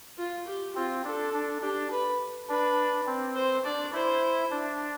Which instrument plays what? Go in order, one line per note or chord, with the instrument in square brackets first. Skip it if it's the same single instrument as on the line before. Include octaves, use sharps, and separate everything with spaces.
[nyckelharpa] F4
G4
[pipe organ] C4 [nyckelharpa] F4
[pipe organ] D4 [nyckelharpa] A4
[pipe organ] D4
[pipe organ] D4 [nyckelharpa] G4
[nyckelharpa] B4
[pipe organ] D4 [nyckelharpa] B4
[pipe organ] C4
[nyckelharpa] C5
[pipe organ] D4 [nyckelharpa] D5
[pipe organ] E4 [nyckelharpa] C5
[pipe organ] D4